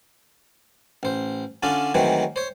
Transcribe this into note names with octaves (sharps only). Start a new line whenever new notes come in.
A1 C5
D3 C#4 D4 F4 A4
D#3 E3 F#3 G#3 A3 C4
C5 C#5